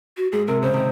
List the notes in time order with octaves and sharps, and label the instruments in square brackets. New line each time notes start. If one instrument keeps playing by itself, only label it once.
[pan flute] F#4
[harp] G#2 [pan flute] G#4
[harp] C3 [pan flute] A#4
[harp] C#3 [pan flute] C5
[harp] C3 D#3